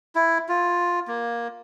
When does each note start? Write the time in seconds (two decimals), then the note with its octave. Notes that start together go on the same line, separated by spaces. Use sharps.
0.15 E4
0.48 F4
1.08 A#3